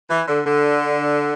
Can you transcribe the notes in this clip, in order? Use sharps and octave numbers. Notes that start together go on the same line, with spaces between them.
E3
D3
D3